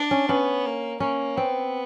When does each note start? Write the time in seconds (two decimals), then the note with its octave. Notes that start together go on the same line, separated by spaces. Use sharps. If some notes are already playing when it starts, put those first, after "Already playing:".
Already playing: D4
0.11 C#4
0.29 B3 C#4
0.66 A#3
1.00 A#3 C#4
1.37 B3 C4